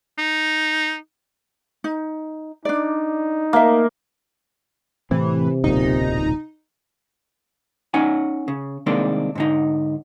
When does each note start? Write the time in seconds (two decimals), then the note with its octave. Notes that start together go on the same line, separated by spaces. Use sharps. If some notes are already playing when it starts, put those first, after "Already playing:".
0.18 D#4
1.84 D#4
2.65 D4 D#4 D5
3.53 A#3 E5 F5
5.11 A2 C3 E3 C4
5.64 D1 B1 A#2 D#4
7.94 C#4 D#4 F#5 G#5
8.48 C#3
8.86 C2 D#3 G#3 A#3 C4 D4
9.35 G#2 D3 D#4